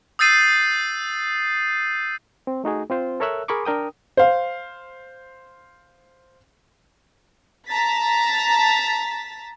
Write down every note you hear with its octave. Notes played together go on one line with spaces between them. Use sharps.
D#6 E6 G6 A6 C7 D#7
C4
A3 D#4 F#4 G#4
C4 F4 C5
A4 A#4 C#5 E5 E6 F#6
G#4 A#4 G#5 B5 C#6 D6
D4 A#4 G5 D#6
C5 F5
A5 A#5 A6 B6